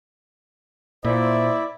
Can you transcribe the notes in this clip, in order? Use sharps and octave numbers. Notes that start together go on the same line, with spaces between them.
A#2 E4 C5 D5 E5